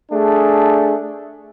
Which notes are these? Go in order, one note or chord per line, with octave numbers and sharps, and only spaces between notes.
A3 D4 G#4